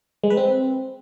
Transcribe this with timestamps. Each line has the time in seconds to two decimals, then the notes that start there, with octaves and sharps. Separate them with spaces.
0.24 G#3
0.30 B4
0.37 C4